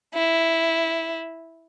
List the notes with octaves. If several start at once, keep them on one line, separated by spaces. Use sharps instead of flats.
E4